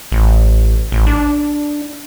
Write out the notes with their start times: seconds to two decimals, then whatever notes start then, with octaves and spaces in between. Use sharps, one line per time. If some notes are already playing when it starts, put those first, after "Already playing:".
0.12 A1
0.92 A1
1.07 D4